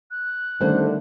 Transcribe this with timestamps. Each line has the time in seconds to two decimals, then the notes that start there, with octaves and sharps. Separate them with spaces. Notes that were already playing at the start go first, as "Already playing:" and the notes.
0.11 F#6
0.61 D3 D#3 G3 A3 C#4 C5 G#5